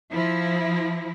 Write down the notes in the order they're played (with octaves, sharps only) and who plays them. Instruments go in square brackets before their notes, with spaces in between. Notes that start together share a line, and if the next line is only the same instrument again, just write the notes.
[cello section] F3 E4